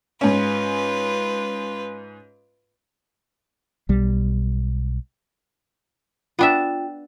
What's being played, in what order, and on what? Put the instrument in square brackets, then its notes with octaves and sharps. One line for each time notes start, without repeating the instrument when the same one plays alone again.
[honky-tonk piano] G#2 C#4 [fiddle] F4 B4
[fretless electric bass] B1 G3
[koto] B3 D4 E5 [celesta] F4 G5